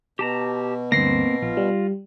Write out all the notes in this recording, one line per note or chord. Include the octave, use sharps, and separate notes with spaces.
B2 G4 A5 A#5
D2 G2 A#3 C4 A#6 C7
A#1 F4
G3